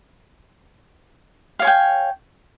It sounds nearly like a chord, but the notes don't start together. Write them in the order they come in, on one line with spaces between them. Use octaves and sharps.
F5 C#5 G#5 G5